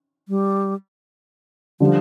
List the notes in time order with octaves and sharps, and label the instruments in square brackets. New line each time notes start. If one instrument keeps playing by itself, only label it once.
[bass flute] G3
[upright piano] D3 G3 [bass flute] F3